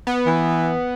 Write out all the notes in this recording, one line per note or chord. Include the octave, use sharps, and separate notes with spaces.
B3
E3